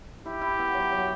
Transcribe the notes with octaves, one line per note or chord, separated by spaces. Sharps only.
E4 G4
E4
B3
F#3
F#3